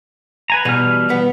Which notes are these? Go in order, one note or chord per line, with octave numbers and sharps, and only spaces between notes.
B4 G#5 A#5
B2 E3 G3 F6
B3